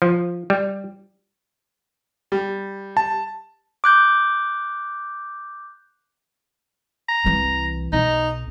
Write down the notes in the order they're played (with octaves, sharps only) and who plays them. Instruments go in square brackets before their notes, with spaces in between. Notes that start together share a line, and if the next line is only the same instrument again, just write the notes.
[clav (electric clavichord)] F3
G3
[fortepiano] G3
[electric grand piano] A5
[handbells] D6 F#6 G6
[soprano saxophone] A#5
[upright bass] C2 E3
[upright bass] B1 [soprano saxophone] D#4